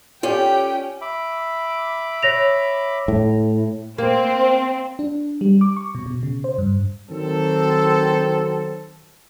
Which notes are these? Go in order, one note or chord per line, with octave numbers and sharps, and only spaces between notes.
C#4 F4 G4 A4 D5 G5
E5 B5 D6
C#5 A#6 F7
A2
A#3 C4
D4
G3
D6
C#6
B2
B2
C#3
C5
G2
D#3 F#3 C4 A4